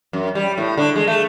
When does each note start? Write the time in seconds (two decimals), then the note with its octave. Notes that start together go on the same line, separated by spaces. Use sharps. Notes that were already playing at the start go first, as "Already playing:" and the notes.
0.13 F#2
0.35 G3
0.58 A2
0.77 D3
0.96 G#3
1.07 A3